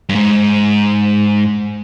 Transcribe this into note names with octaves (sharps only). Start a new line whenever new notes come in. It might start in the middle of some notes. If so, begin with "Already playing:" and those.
G2
G#2